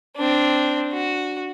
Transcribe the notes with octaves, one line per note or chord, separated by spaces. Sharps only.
C4 D4
F#4